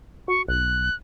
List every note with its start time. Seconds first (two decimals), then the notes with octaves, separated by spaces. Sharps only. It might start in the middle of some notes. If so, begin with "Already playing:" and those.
0.28 F#4 C#6
0.48 B1 F#6